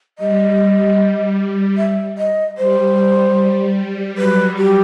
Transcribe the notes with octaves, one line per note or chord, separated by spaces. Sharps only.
G3 D#5
E5
D#5
G3 C5
F#3 B4
G4